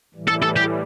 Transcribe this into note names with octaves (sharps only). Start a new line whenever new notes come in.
A2 E3 G3
A4
A4
G4